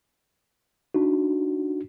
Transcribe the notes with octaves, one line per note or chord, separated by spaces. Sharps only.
D4 D#4 F#4